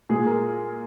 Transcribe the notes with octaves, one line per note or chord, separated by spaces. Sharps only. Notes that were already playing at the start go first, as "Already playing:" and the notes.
A#2 G#3 G#4
A#4